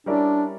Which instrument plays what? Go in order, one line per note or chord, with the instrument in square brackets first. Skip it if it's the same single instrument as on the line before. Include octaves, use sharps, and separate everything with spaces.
[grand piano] G3 C#4 E4 A#4 D5 [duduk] D4